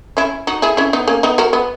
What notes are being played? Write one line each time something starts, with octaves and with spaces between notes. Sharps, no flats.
C#4 E4
D#4 F#4
E4 G#4
C#4 E4
B3 D#4
A#3 C#4
B3 D#4
F#4 A#4
B3